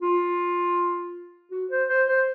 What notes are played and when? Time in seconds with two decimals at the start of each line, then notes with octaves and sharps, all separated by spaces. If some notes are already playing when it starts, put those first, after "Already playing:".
0.02 F4
1.51 F#4
1.71 C5
1.89 C5
2.08 C5